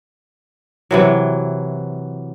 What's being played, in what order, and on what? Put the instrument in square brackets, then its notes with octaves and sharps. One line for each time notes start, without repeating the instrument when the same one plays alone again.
[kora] C3 E3 F#3